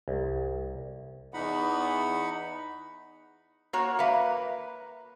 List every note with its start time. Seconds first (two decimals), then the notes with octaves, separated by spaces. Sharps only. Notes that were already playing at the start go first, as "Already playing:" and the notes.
0.08 C2
1.34 E2 D#4 F#5 B5
3.73 A#3 F#4 C#5
3.99 A#3 B4 E5 F5